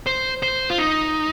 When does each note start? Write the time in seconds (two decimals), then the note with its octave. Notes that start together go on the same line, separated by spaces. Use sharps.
0.07 C5
0.43 C5
0.70 F4
0.78 D#4